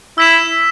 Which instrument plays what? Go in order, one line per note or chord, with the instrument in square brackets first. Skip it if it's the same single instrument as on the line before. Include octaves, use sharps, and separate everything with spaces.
[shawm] E4 [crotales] E6 B6 E7